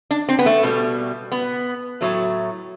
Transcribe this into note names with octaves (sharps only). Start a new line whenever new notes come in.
D4
C4
B3
A3
B2 G3
B3
A2 F#3 A3